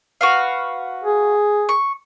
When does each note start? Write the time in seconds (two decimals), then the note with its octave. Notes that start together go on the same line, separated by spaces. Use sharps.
0.21 F#4 B4 F5
1.04 G#4
1.69 C#6